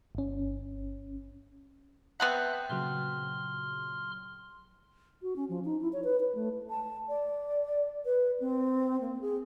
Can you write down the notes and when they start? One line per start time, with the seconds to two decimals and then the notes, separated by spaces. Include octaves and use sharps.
0.15 G1 C#4
2.20 B3 C4 E5 F#5 A5 F#6
2.70 A#2 C#3 F#3 C6 F6
5.22 F#4
5.36 C#4
5.49 F3
5.65 D#4
5.81 E4
5.93 C#5
6.04 B4
6.20 B4
6.35 A3
6.70 A5
7.09 D5
8.05 B4
8.40 C4
9.01 A#3
9.21 G#4